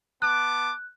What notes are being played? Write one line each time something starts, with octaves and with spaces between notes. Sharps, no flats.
B3 A5 D6 F#6